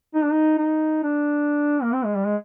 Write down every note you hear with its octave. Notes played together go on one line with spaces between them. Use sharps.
D#4
D4
D#4
D#4
D4
A#3
C4
G#3
G3
G#3